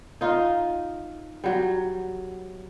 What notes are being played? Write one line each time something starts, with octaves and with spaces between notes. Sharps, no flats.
D#4 F4
F#3 G3